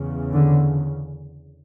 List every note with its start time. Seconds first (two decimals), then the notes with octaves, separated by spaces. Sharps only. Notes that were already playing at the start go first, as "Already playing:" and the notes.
Already playing: E2 C#3
0.32 D3